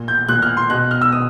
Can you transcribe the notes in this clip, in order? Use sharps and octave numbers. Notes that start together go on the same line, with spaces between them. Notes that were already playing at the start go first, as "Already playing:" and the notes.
Already playing: A#2
G6
A#2 F#6
F6
C6
B2 F#6
F6
E6
B2 D#6